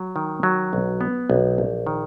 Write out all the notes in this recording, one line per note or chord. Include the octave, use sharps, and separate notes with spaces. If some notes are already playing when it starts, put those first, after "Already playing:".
Already playing: F#3
D#3
F#3
B1
B3
B1
A#1
D#3